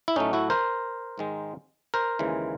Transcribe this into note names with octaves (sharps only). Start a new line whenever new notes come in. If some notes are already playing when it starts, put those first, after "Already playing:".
E4
A2 F#3 A3 C#4 D#4
E4 F#4
A#4 C5
G#2 D#3 G#3
A#4 C5
D#2 C#3 E3 G#3